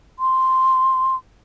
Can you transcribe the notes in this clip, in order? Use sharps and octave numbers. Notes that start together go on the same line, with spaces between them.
C6